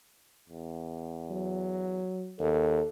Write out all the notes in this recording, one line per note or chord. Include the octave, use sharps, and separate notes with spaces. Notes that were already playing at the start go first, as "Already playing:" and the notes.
E2
F#3
D#2 A4